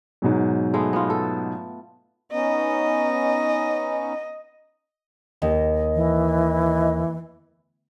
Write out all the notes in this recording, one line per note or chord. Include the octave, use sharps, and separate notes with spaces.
G#2 B2 F#3
G#3 A3 B3
B3 F4
A4
B3 C#4 D#4 D#5
D#2 D#5
E3